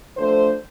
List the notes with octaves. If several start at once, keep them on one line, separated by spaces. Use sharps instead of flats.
D3 F3 A3 C5